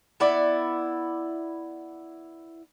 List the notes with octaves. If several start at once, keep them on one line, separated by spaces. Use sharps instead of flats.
B3 E4 D5